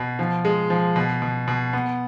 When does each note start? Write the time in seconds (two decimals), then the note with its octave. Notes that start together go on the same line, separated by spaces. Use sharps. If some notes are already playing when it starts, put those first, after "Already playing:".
Already playing: B2
0.19 F3
0.45 G#3
0.70 F3
0.96 B2
1.22 B2
1.48 B2
1.73 B3